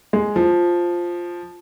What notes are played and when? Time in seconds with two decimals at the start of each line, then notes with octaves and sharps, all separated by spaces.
0.13 G#3
0.36 F3